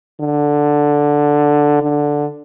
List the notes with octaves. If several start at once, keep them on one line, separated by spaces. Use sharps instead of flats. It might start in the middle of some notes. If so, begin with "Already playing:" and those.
D3
D3